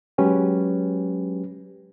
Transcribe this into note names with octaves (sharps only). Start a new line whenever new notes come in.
F#3 G#3 C#4 G4 B4